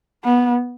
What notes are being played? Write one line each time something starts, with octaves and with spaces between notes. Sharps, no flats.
B3